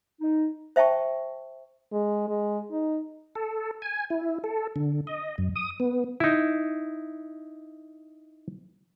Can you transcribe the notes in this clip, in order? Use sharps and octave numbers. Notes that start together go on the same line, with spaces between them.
D#4
C5 E5 G5 A5 C#6
G#3
G#3
D#4
A4
G#5
E4
A4
D3
D#5
F#2
D#6
B3
D#4 E4